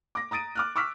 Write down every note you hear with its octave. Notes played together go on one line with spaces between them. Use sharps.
D6 A#6
A#5 D#6 A6 D7 D#7
D6 F6 F#6
C#6 D6 E6 F6 B6